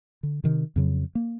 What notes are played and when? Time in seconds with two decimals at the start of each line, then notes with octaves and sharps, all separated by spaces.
0.23 D3
0.44 C3 D#3
0.76 F2 C#3 F#3
1.15 A#3